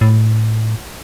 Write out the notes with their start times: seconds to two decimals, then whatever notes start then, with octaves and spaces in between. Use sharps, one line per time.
0.01 A2